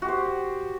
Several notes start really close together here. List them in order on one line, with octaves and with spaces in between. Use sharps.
F#4 G4 C5